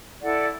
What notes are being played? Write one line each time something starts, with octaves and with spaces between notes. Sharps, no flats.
E4 A4 D5 F#5